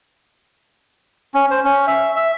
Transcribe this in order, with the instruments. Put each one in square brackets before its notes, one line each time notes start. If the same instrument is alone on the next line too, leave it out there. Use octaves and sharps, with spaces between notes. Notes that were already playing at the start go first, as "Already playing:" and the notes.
[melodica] C#4
C5
C#4
E5
E5